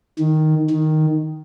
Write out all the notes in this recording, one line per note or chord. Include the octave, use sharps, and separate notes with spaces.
D#3
D#3